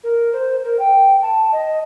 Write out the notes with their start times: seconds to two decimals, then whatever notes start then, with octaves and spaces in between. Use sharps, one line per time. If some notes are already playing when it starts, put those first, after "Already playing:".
0.04 A#4
0.33 C5
0.64 A#4
0.79 G5
1.22 A5
1.52 D#5